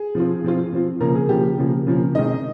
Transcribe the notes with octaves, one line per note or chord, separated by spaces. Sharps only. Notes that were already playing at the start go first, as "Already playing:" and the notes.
Already playing: G#4
F3 C4 F4
F3 C4 F4
F3 C4 F4
C#3 F3 A#3 A#4
G#4
C#3 F3 A#3 G4
C#3 F3 A#3
C#3 F3 A#3
D#3 G#3 C4 D#4 D#5